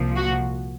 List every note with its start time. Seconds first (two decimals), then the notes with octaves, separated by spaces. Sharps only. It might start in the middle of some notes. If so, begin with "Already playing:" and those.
Already playing: C2 A#2 F3
0.16 F#4